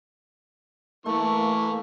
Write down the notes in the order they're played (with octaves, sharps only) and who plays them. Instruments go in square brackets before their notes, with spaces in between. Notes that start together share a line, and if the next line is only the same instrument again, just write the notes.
[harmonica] E3 C#6 [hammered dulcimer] A3 [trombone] A#3